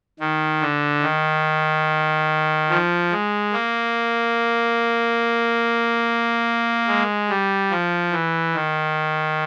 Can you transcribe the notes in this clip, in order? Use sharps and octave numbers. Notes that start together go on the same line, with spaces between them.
D#3
D3
D#3
F3
G#3
A#3
G#3
G3
F3
E3
D#3